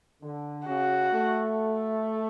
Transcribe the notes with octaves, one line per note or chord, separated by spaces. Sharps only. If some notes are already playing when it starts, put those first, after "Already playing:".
D3
C#3 F#4
A3